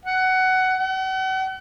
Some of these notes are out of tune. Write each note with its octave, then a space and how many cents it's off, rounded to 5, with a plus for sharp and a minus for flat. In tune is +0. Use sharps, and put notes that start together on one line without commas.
F#5 +15
F#5 +40